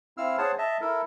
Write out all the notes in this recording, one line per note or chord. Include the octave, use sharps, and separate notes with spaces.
C4 E4 F5 E6 F6
G#4 C5 C#5 F#5 A5
D#5 E5 A5
E4 A4 A#4